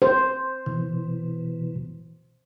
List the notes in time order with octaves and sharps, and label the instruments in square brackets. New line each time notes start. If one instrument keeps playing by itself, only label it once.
[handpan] C5
[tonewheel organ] B2 E3